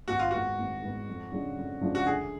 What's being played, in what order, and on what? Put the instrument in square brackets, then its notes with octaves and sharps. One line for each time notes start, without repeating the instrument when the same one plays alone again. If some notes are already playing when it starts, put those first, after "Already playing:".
[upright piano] G#1 [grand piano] F#4
[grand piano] F4
[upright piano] G#2 G#3 B3 [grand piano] F#4
[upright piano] G#1
G#2 G#3 B3
F2
C#3 F3 G#3 D4
F2
C#3 F3 G#3 D4
[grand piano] F#4
[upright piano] D2 [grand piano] G#4